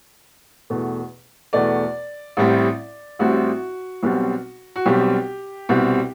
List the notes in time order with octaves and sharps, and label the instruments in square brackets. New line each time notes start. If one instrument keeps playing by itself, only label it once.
[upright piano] E2 B2 A3
E2 B2 A3 D5
A1 A2 G3 C4
A1 A2 G3 C4 F#4
B1 B2 G3 C4
F#4
B1 B2 G3 C4 G4
C2 B2 G3 C4